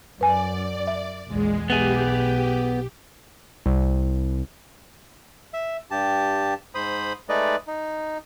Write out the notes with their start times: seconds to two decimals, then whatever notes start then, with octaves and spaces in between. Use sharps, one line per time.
0.21 F#2 B4 D5 G#5
0.87 E5
1.28 A#1 E2 G#3
1.70 B1 B3 G4 G#4
3.66 C2
5.53 E5
5.91 G2 G4 A5
6.75 G#2 C5 B5 D#6
7.29 G#3 A3 D#4 B4 D5 D#5
7.68 D#4